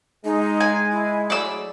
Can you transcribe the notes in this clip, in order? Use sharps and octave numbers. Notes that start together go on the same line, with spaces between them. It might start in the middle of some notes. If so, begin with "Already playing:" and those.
G#3 D#4
G#5
E4
F#3 A3 G#4 D5 E6